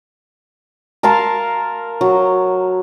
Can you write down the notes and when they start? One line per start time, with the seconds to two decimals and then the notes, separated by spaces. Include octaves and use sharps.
1.03 A#4 F5 A5 C6
2.01 F#3